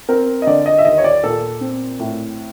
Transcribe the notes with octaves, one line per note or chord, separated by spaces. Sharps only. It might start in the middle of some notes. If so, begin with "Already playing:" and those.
C4 A#4
D#5
D3 D5
D#5
E5
D#2 D#5
C#5
D5
A#2 A4
C4
A2